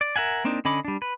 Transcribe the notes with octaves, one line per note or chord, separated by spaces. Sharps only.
D5
A#4 E5 F#5 G#5
A#3 C4 D4 D#4
D3 C#4 D#5 B5 D6
G3 D4
B4